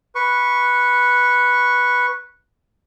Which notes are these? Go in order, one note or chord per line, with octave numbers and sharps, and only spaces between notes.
B4 C#6